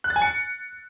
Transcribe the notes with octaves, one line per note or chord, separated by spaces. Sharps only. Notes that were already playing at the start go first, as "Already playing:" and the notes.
F#6
A6
G#5
C#7